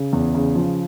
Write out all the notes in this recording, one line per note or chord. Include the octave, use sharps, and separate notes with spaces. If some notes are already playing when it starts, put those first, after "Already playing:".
Already playing: C#3
E2
C#3
F3